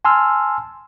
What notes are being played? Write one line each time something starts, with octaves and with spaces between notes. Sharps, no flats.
G#5 A5 C6 E6 F6